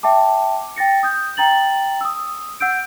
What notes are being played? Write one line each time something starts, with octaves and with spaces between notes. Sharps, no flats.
E5 G5 A5 D6
G5 A6 A#6 C#7
D#6 G6
G5 A#5 A6 F#7
D#6 E6
F#5 E6 G6 D7